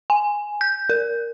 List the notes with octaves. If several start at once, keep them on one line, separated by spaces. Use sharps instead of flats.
G#5
G6
A#4